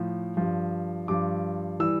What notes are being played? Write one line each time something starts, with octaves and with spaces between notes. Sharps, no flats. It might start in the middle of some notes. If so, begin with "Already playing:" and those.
Already playing: A2 F3
G2 F3
G2 F3 D6
E3 G3 E6